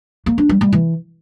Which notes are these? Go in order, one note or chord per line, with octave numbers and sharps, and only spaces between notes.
A#3
D4
G3
G3
E3